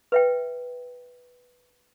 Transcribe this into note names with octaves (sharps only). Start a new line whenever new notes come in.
B4 E5 G5